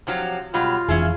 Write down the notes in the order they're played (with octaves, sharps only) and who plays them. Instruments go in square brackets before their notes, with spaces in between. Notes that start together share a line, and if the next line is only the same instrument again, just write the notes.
[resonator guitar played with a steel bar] C3 F3 F#3
[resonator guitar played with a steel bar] B2 F#3 G3 [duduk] F4
[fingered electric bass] F1 E3 [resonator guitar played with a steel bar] C#4 E4 G#4